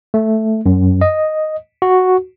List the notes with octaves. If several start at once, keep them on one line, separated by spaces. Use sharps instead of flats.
A3
F#2
D#5
F#4